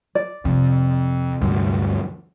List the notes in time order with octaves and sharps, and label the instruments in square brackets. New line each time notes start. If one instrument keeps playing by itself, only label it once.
[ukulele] D5
[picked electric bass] F2 [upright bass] C3
[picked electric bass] D2 G2 F#3